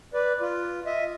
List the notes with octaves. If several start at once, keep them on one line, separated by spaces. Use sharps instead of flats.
B4 D5
F4
D#5 E5